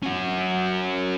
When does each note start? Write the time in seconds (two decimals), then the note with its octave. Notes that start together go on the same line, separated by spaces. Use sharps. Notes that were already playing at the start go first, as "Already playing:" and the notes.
0.03 C#4 F#4